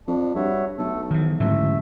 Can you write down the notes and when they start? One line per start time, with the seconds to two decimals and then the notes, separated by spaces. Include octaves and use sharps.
0.08 F2 D4
0.36 G2 F#4 C#5 E5
0.78 B1 A3 A4
1.11 G#2 D#3 E3
1.40 A1 G#2 D3 F#3 A3 E5